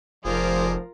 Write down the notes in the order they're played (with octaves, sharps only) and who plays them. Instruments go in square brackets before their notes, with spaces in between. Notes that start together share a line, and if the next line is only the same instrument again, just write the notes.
[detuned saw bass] F1 [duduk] F3 [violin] F4 A#4 [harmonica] G#4 C5 D5